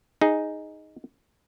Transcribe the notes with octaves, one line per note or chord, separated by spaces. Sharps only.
D#4 G#4